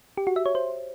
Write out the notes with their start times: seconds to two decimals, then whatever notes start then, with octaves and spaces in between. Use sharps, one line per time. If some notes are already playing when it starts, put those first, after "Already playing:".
0.17 G4
0.27 F#4
0.36 E5
0.46 C#5
0.55 C5